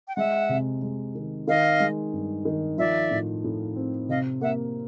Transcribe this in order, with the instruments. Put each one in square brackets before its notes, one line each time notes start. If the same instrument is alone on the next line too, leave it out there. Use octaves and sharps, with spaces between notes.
[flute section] G5
[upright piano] G#3 [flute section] E5 F#5
[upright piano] C3
G#3
D#3
[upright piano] D#3 [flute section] D#5 F5
[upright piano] G#3
G2
D#3
[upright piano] F3 [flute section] D5 E5
[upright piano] A2
A2
C4
[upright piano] C3 [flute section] D#5 F5
[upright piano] A#3 [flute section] E5 F#5